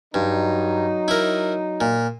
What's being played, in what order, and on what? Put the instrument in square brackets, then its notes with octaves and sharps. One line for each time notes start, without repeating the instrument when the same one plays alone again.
[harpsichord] G2 [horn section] F#3 D#4
[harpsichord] E4 A#4
A#2